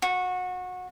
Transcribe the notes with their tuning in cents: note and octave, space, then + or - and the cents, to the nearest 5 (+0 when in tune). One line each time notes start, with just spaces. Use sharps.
F#4 -25